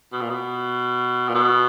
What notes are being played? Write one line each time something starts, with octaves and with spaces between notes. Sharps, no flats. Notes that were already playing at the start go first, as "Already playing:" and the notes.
B2
A#2
B2
A#2
B2